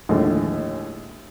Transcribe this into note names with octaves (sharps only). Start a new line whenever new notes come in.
D#2 A2 D3 F3 G#3